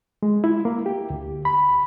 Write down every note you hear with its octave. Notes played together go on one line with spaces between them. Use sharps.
G#3
E4
A#3
G4
D2
B5